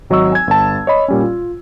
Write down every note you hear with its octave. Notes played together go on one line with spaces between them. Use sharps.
G#1 F#3 D#5 C#6 E6
G#5 G#6
G1 A5
C#5 D#5 B5
A#2 G3 C#4
F4